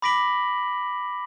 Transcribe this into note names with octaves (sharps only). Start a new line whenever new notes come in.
B5 D6 A#6 B6 D7 F#7